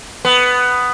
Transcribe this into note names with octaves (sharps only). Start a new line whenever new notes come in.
B3